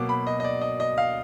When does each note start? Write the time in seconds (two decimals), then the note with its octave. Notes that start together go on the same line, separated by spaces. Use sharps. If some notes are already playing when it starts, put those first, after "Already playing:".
Already playing: B2 F#3 A#3 D6
0.09 B5
0.27 D#5
0.40 D#5
0.44 D5
0.61 D#5
0.80 D#5
0.98 F5